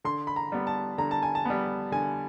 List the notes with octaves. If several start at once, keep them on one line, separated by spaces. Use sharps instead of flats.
D3 C6
B5
A#5
G3 B3
A5
D3 A#5
A5
G#5
A5
G3 B3
D3 G#5